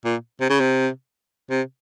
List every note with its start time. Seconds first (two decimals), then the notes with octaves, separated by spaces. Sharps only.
0.05 A#2
0.41 C3
0.50 C#3
0.60 C3
1.50 C3